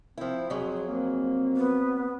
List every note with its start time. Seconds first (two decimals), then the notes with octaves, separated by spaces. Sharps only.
0.17 F3 C4 E4
0.50 F2 F#3 G#4
0.88 A#3 C4
1.56 B3